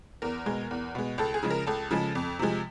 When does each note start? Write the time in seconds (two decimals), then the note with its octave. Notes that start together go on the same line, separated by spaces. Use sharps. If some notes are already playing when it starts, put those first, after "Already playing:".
0.22 E2 A#4
0.46 B2 G#3
0.71 E2
0.95 B2 G#3
1.18 C#2 A4
1.34 G#4
1.43 C#3 F3 G#3
1.50 A#4
1.67 C#2 A4
1.91 C#3 F3 G#3
2.15 F2
2.39 C3 F3 G#3